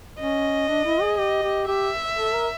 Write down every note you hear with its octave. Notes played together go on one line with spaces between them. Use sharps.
C#4 D#5
D4
E4
G#4
G4 D#5
G4
G4 E5
A4
A#4